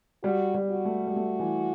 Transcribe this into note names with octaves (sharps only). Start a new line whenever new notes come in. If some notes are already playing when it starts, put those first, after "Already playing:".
G3 F#4
G3
F#4
A3
G3
A3
E3